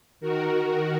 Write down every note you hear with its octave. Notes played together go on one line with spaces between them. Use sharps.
D#3 F#4 A#4